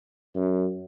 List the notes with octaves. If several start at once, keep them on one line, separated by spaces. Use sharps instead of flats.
F#2